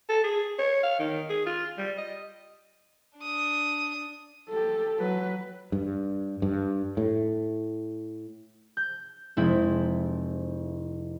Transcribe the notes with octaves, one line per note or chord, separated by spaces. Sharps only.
A4
G#4
C#5
F5
D#3
G#4
F4
G3
D#5
D4 D#6
G4 A4
F#3 B4
G2
G2
A2
G6
F1 G#3 C4 E4